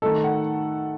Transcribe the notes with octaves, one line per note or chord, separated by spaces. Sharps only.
D#3 A3 D#4 A4
F#5